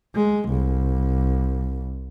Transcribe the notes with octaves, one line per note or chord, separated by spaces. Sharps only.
G#3
C2